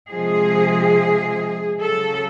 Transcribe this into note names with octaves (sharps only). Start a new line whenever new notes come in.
C3 F3 G#3 G#4
C#3 F#3 A4